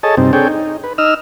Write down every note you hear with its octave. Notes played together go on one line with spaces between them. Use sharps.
G#4 A4 C#5 D#5 A5
G2 C3 C4 D#4
C4 D4 G#4 A4 C#5 G5
D#4
B4
D#4 D#5 E6 F6